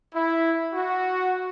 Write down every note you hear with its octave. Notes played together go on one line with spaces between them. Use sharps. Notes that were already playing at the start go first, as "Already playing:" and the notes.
E4
F#4